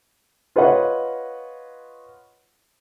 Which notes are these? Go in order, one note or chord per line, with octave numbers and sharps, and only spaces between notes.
F4 B4 C#5 D#5 F#5